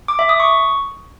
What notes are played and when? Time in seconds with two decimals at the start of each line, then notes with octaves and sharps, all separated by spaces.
0.08 D6
0.19 E5
0.29 D#6
0.40 C#6